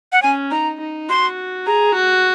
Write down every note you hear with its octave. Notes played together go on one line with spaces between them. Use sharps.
F#5
C#4 G#5
D#4 A#5
D#4
F#4 C6
G#4 A#5
F#4